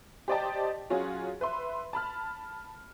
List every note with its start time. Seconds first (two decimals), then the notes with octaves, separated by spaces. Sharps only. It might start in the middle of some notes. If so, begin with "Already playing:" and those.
0.28 G4 C5 D5 D#5 G5 A5
0.90 F#3 C#4 F4 F#4 G#4
1.41 B4 E5 C6
1.93 A5 B5 F6